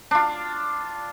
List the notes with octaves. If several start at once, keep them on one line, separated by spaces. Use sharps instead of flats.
D4 F4